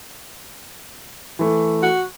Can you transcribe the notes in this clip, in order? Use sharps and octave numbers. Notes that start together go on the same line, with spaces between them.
E3 A3
F#4